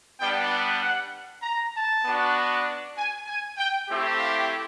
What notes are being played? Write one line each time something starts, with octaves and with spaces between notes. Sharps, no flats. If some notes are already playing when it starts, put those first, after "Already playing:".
G3 B3 D4 G5
F#5
F#5
A#5
A5
B3 D4 F#4
G#5
G#5
G5
A3 C4 E4 G4
F5